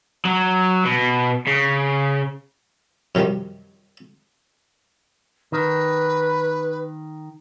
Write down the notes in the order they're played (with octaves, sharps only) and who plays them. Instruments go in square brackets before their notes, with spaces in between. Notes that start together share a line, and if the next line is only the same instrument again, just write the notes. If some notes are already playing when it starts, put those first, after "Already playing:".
[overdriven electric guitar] F#3
B2
C#3
[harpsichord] F#2 C3 D#3 F3 G3
[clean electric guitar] D#3 [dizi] B4